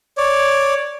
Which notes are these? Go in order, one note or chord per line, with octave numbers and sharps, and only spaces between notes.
C#5 D5